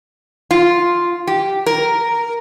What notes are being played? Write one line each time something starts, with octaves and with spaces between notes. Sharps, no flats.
F4
G4
A#4